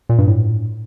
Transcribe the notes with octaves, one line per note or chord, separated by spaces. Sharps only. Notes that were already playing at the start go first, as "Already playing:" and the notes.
A#2
G2
A2